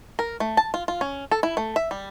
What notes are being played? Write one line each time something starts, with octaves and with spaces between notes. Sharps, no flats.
A#4
A3
A5
F4
F4
C#4
A4
E4
A3
E5
G3